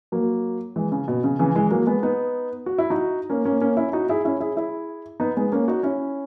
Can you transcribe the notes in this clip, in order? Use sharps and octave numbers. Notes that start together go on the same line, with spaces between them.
F#3 A#3
E3 G#3
C#3
B2
C#3
C#3 E3
E3 G#3
F#3 A#3
G#3 B3
B3 D#4
F#4
E4
D#4 F#4
A#3 C#4
A#3 C#4
A#3 C#4
C#4 E4
D#4 F#4
E4 G#4
C#4 E4
E4 G#4
E4 G#4
B3 D#4
G#3 B3
A#3 C#4
D#4 F#4
C#4 E4